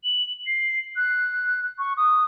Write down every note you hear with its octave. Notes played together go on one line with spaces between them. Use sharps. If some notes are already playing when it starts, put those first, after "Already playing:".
F#7
C7
F#6
C#6
D#6